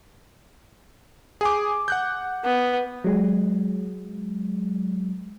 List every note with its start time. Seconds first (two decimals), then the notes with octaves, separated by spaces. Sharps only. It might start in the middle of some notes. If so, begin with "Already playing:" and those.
1.41 G#4 G#5 D6
1.88 F#5 F#6 G6
2.44 B3
3.04 F#3 G#3